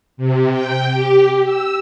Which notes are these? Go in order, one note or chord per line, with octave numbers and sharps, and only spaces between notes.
C3
G5
G4
E6